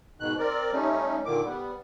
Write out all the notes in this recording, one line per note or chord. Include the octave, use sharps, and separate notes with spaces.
G#2 B2 D#3 F#6
C4 A#4 D5
G3 A3 C#4 D#4
A#2 D3 D#3 D6
G3 B3